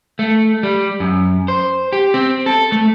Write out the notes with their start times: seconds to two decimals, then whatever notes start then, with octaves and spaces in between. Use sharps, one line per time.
0.19 A3
0.63 G3
1.00 F#2
1.48 C5
1.93 G4
2.14 C4
2.46 A4
2.72 A3